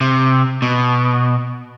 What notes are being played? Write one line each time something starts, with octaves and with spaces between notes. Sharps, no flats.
C3
B2